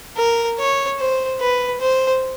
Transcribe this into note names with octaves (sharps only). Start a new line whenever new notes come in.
A#4
C#5
C5
B4
C5